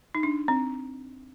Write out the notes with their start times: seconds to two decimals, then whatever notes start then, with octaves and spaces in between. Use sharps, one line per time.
0.15 D#4
0.23 D4
0.48 C4